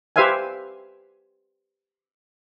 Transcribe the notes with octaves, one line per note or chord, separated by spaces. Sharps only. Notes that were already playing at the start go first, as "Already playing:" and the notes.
G4 B4 C5 E5 F5 G#5